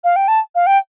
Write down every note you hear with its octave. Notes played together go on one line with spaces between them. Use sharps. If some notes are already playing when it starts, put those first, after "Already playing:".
F5
G5
A5
F5
G5